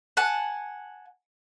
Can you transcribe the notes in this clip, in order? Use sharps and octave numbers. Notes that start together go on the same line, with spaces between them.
F#5 G#5 A5